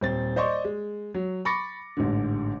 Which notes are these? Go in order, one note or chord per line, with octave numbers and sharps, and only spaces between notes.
D#1 C4 A6
C5 D5 D#5 C6 C#6
G#3
F#3
B5 C#6 D6 A6 A#6 C#7
A1 G#2 D3